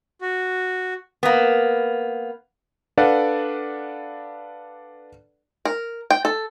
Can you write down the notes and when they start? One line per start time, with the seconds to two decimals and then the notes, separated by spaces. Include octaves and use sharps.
0.21 F#4
1.23 A#3 B3
2.98 D4 A4 B4 D5 F5 F#5
5.65 A#4
6.11 G5
6.25 A4